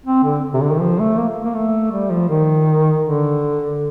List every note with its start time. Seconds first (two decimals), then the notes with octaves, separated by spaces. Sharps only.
0.06 C4
0.24 D3
0.54 C3
0.61 D3
0.70 D#3
0.80 F3
0.99 A3
1.17 A#3
1.45 A#3
1.54 A3
1.91 G3
2.10 F3
2.29 D#3
3.03 D3